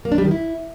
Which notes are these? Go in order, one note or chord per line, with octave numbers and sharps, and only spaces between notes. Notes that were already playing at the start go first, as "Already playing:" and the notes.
A#3
D4
G3
D#3
E4